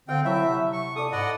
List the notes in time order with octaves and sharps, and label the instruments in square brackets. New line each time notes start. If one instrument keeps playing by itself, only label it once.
[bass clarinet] D3 [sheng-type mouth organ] C4 G5 [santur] F5
[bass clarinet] F#3 [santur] E4 C#5 A5 [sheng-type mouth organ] E5
[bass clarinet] C3 [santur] F#5
[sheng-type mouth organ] C#6
[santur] A4 D5 [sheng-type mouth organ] D#6
[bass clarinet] G#2 [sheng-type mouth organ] D5 D#5 F#5 [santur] B5